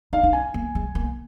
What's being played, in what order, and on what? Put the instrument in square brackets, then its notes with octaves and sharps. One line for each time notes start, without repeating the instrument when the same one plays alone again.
[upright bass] D#4 [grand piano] F5
[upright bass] D#4
[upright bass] C#4 [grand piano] G#5
[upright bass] A#3
G#3
A#3